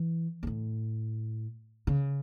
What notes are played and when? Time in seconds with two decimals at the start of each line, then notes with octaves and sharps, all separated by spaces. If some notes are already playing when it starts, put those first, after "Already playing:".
Already playing: E3
0.43 G#2
0.47 A2
1.87 C#3